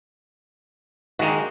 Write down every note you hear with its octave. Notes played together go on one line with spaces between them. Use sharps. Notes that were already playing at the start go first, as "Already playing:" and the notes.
D#3 G#3 A#3 D#4 F#4